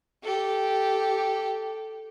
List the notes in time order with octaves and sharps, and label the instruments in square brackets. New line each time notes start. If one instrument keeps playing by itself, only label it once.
[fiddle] G4 A4